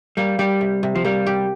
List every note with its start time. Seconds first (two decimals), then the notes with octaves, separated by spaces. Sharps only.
0.17 G3 A#3
0.39 G3 G4
0.61 C3
0.83 C3
0.95 F3
1.04 G3 A#3
1.27 G4